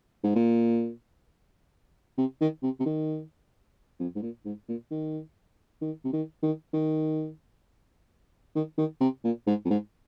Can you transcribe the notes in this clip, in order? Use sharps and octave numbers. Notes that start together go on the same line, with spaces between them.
G#2
A#2
C3
D#3
C3
C3
D#3
F2
G#2
A#2
G#2
A#2
D#3
D#3
C3
D#3
D#3
D#3
D#3
D#3
C3
A#2
G#2
F2
G#2